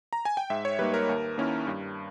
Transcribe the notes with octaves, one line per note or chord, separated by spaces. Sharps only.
A#5
G#5
G5
G#2 E5
C#5
G3 A#3 D#4 B4
A#4
D#2
D#3 A#3 C#4 E4
G2